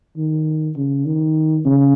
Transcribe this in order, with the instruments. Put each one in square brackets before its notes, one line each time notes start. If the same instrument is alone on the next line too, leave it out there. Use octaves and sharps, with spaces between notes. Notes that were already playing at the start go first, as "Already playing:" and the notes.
[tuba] D#3
C#3
D#3
C#3